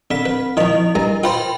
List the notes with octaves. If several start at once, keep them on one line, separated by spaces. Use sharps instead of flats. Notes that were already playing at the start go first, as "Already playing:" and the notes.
D3 C4 B6
B4
D#3 F3 E4 D#5 F7
G2 A#4 A#5
F4 B4 C5 G5 B5 C6